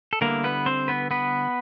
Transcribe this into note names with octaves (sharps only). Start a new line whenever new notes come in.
A4
D3 G3 A#3 B3 E4 A#4
B3 B4
C4 C5
B3 B4
B3 B4